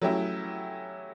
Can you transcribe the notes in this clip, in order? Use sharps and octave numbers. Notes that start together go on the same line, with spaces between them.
F#3 A3 C#4 E4 G4